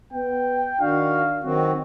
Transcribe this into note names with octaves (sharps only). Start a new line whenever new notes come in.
B3 G5
D#3 D4 F#4 F5
D#3 F#3 C4 F#4